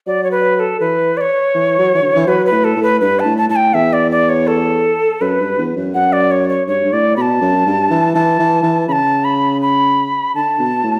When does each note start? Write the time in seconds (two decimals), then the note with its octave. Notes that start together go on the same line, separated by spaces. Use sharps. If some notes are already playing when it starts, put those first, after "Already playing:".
0.07 F#3 D5
0.23 C#5
0.31 B4
0.56 B4
0.60 A4
0.80 E3 B4
1.17 D5
1.21 C#5
1.54 E3
1.79 F#3
1.95 E3
2.02 D3
2.16 E3
2.27 F#3 B4
2.46 B4
2.52 A2
2.64 A4
2.77 A2
2.83 B4
3.01 G2 B4
3.20 A5
3.25 A2
3.37 A5
3.49 A2 A5
3.56 G5
3.74 E2 E5
3.93 D5
4.11 D5
4.29 C#5
4.47 A4
5.21 F#2 B4
5.40 G2
5.58 E2
5.76 F#2
5.94 F#2 F#5
6.13 D5
6.31 C#5
6.49 C#5
6.67 G2 C#5
6.84 G2
6.92 A2 D5
7.17 B2 A5 B5
7.41 F#2
7.66 G2
7.90 E3
8.14 E3 A5
8.39 E3
8.63 E3
8.88 C#3 A5 B5
9.24 B5
9.62 B5
10.35 D3 A5
10.59 B2
10.84 A2